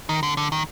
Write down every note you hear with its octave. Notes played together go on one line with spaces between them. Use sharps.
D#3
D3
D3
D#3